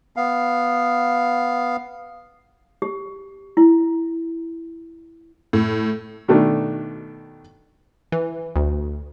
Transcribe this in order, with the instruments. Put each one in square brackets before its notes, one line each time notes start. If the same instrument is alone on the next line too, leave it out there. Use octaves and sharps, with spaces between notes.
[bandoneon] B3 F5
[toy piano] G4
E4
[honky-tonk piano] A2
[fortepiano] B2 D#3 A3 D4
[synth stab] E3
D2